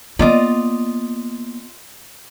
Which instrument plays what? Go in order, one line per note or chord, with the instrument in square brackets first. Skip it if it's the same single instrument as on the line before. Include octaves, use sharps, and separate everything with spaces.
[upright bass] A#3 B3 [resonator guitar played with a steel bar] F4 D5 D#5